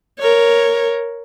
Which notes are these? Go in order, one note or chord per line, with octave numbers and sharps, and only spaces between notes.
A#4 C#5